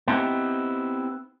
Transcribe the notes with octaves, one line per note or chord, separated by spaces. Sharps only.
B3 C4 D#4 E4 G4